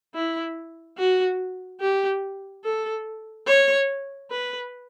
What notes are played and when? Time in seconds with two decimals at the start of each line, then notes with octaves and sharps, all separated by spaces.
0.15 E4
0.98 F#4
1.81 G4
2.64 A4
3.47 C#5
4.31 B4